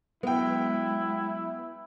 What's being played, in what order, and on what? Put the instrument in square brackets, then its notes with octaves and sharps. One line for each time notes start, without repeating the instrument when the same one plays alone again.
[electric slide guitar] F#3 G#3 [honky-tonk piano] B3 G5 [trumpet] E4